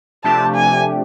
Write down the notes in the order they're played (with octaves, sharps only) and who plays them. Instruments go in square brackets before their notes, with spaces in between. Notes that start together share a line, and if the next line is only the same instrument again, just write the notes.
[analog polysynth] C3 F3 A3 D4 G4 [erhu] A5
[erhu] G#5